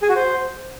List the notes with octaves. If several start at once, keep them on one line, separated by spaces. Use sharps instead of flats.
G#4
F#4
C5